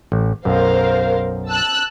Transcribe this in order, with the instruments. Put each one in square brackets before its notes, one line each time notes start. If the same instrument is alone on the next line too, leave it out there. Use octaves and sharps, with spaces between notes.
[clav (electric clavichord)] A1
[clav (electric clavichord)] B1 F#2 [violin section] A#4 C5 F5
[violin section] A5 E6 F#6